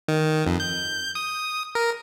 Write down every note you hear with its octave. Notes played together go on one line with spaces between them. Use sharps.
D#3
F2
G6
D#6
A#4